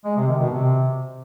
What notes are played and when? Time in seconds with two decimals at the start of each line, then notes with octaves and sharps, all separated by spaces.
0.05 G#3
0.16 C3
0.28 D#3
0.40 B2
0.52 C3